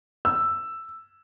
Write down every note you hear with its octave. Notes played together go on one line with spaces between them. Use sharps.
E6